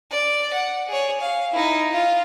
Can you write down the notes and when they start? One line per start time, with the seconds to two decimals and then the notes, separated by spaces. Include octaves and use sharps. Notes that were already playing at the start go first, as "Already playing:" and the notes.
0.11 D5
0.53 F#5
0.88 G#4 C#5
1.20 F5
1.52 D#4 E4
1.91 F4 F5